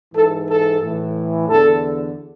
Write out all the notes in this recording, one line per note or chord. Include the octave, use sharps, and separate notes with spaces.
G#2 E3 A4
A4
A2 E3
E2 D3 A4